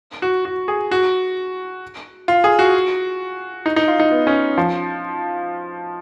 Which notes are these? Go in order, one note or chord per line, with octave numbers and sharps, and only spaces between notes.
F#4
F#4
G#4
F#4
F4
G#4
F#4
D#4
D#4
F4
D#4
B3
C#4
F3